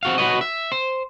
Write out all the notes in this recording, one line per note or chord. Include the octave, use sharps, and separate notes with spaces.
C4 F#4 F5
F#4 B4 C#5 D#5
E5
C5